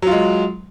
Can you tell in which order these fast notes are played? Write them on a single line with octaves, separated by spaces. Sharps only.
F#3 F4 G#3